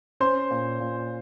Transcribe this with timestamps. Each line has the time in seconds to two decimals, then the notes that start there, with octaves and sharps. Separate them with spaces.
0.20 C#4 C5 C6
0.50 A#2
0.80 A#2